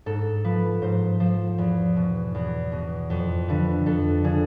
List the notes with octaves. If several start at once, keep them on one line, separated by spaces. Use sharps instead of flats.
G#2 A4
F3 B4
G#2 C5
F3 C5
E2
B2
E2
B2
F2 C5
D3 F3 B4
F2 A4
D3 F3 G#4